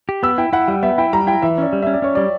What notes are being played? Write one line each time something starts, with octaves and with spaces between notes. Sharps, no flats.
G4
B3 E6
E4 G5
E4 F#5
G3 F#5
B3 E5
E4 G5
G3 A#5
E4 G5
E3 E5
C#4 D5
G3
C#4 E5
D5
C#4 C#5
G3 D5